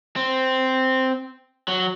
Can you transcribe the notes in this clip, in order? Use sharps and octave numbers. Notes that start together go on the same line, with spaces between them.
C4
F#3